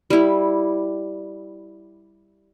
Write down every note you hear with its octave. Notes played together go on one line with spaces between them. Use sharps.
G3 E4